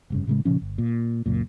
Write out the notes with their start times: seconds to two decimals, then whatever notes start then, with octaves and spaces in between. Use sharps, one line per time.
0.10 F1 G2 C#3
0.27 A2 C#3 G#3
0.45 A#2 C#3 F3 C#4
0.62 G1
0.78 A#2
1.26 C#2 F#2 A#2